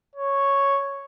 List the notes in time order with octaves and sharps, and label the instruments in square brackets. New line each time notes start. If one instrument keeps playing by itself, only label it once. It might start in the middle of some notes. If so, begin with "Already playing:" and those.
[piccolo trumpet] C#5